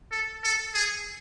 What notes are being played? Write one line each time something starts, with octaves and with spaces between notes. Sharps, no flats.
A4
A4
G#4